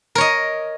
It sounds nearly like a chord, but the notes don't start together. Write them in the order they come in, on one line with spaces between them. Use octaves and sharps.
A#4 C#5 D#5